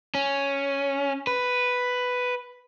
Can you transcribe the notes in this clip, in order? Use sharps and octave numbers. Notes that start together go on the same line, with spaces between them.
C#4
B4